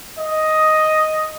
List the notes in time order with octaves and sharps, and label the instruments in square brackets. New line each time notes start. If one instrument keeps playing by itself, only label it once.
[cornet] D#5